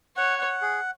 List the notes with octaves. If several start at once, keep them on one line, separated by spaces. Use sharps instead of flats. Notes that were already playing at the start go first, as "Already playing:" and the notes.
C#5 F#5
F#5
G#4